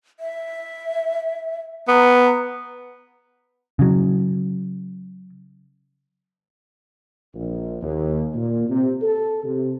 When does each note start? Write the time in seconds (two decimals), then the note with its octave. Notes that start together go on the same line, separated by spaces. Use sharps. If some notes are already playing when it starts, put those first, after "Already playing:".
0.20 E5
1.88 B3 A#5
3.79 C#3 F#3
7.34 A#1
7.82 D#2
8.34 A#2
8.69 C3
9.01 A4
9.44 C3